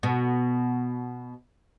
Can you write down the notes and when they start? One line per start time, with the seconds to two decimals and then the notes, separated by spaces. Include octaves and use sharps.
0.03 B2 B3